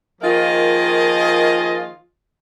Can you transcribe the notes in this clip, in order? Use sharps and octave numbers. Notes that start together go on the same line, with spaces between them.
D#3 F3 A#3 F4 G#4 D#5